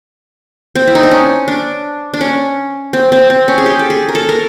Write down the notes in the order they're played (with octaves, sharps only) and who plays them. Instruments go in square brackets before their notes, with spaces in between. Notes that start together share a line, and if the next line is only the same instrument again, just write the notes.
[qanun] C4
E4
D#4
D4
C#4
D4
D4
C#4
C4
C4
C4
C#4
G#4
G4
A4
G#4
A#4
A4
A#4